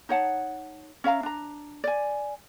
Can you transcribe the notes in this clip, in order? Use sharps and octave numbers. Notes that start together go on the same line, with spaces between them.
D#4 C#5 F#5 A5
C#4 E5 F5 A#5
D4 A#5
D5 G#5